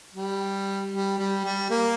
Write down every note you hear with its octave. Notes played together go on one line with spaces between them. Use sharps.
G3
G3
G3
G3
A#3